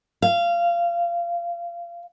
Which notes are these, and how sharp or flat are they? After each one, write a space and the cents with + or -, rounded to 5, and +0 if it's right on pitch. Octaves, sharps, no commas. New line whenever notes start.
F5 -20